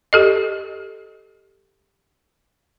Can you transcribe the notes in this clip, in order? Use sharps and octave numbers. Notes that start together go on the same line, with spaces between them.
G4 A4 D#5